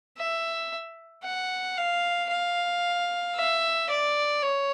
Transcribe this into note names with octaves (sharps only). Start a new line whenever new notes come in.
E5
F#5
F5
F5
E5
D5
C#5